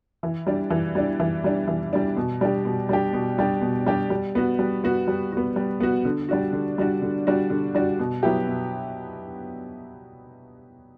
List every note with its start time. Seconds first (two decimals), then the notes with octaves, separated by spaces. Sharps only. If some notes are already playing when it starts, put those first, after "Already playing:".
0.23 E3
0.47 G3 D4
0.70 E3
0.95 G3 D4
1.20 E3
1.44 G3 D4
1.67 E3
1.93 G3 D4
2.17 B2
2.41 G3 D4 G4
2.65 B2
2.89 G3 D4 G4
3.13 B2
3.38 G3 D4 G4
3.62 B2
3.86 G3 D4 G4
4.10 G3
4.35 B3 F#4
4.59 G3
4.84 B3 F#4
5.07 G3
5.32 B3 F#4
5.56 G3
5.80 B3 F#4
6.05 D3
6.29 G3 D4 F#4
6.53 D3
6.78 G3 D4 F#4
7.02 D3
7.27 G3 D4 F#4
7.50 D3
7.75 G3 D4 F#4
8.00 B2
8.23 F#3 B3 E4 G4
8.47 B2